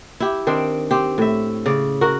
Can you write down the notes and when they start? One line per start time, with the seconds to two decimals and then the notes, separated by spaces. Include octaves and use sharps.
0.20 E4 G4
0.47 D#3 C4 D4
0.91 C4 G4
1.18 A2 E5
1.66 C#3 D5
2.01 F#4 A#4